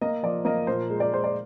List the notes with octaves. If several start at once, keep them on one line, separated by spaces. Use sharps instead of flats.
A#3 D#5
F3 D5
A#3 D#5
A#2 C5
G#3
D5
G#3 C5
D5